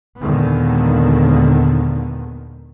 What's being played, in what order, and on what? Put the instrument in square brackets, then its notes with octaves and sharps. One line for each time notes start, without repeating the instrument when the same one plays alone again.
[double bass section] D#2 A#2 D3 D#3 G#3 B3